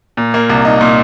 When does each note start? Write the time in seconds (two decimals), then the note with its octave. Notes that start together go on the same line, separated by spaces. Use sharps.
0.17 A#2
0.34 A#3
0.49 C2
0.65 D#4
0.81 A#2